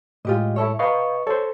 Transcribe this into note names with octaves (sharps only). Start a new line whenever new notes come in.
A2 G#3 F4 G4 D#5
E4 A4 C#5
B4 D#5 F5 A#5 C#6
A4 C5 C#5